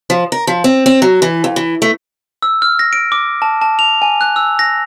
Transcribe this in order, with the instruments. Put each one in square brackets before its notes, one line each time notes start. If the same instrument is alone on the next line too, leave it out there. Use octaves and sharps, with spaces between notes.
[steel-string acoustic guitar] F3
A#4
F3
C4
C4
F#3
E3
F2
E3
A3
[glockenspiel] E6
F6
A#6
D7
D6
A5
A5
F7
G#5
F#6
E6
A#6